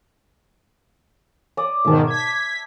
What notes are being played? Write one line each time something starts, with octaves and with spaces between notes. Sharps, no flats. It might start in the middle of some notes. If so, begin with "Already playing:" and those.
D5 D#6
G#2 B2 D#3 E5 A5
G#6 B6